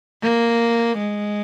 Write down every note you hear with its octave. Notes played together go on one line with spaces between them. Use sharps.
A#3
G#3